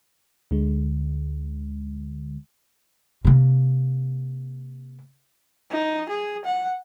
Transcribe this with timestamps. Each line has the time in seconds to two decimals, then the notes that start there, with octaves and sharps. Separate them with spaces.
0.51 D2 D3 G#3
3.25 C3 A#3
5.70 D#4
6.10 G#4
6.45 F#5